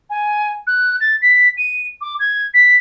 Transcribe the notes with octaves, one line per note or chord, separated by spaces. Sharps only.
G#5
F#6
A6
B6
D#7
D6
G#6
B6